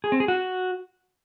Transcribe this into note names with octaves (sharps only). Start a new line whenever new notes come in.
G#4
C4
G#4
F#4